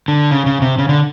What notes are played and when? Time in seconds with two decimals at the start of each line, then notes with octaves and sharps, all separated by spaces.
0.08 D3
0.31 C#3
0.46 C#3
0.62 C3
0.78 C#3
0.89 D3